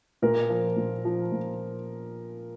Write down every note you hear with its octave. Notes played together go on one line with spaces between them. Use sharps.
A#2 A#4
F3
A#2
F3
A#2